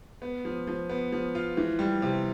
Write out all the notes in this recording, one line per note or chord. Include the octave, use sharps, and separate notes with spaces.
B3
F3
F3
B3
F3
F4
E3
G3
C3